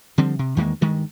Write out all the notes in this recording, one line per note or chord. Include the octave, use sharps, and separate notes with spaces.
D3 F3 G3 C4
C3
E2 D#3 G#3 A#3
G2 D#3 G#3